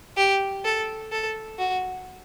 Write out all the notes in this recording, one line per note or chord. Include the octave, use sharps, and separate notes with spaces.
G4
A4
A4
F#4